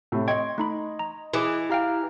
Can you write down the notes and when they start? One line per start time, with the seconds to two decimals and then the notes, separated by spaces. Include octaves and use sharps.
0.12 A2 C3
0.28 D#5 G5 C6 C#6 G#6
0.58 A3 D#4 B5
0.99 A#5
1.34 E3 E4 G#4 D6
1.70 E4 G4 F5 G5 A#5 F6